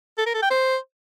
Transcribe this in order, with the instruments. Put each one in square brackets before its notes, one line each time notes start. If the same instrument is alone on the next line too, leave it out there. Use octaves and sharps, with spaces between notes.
[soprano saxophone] A4
A#4
A4
G5
C5